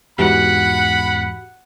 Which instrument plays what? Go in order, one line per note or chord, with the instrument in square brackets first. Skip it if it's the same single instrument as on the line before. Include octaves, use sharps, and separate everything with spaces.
[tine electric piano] E2 G#2 [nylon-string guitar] F#4 G4 [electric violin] F#5 [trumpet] B5